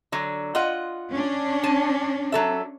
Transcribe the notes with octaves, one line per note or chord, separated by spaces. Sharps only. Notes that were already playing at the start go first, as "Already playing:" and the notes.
D3 F#3
F4 D#5 F#5
C#4 D4
G#5 A5
F#3 A4 E5